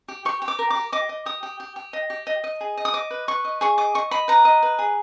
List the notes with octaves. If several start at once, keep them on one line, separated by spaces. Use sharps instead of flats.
G4
G4 C#6
G4
D6
A#4
D6
G4
D#5 D6
D#5
G4 D#6
G4
G4
G4
D#5
G4
D#5
D#5
G#4
D#5
D#6
D#5 D6
B4
B4 C#6
D#5
G#4 C#6
D#5 D6
D#5 C#6
D#5 B5
B4 A#5
D#5
B4
G#4